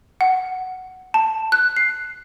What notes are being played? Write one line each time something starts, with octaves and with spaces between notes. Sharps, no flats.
F#5
A5
F#6
C7